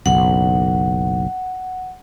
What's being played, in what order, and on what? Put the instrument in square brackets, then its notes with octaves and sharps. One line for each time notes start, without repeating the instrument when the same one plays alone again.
[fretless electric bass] F#1 B1 [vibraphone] F#5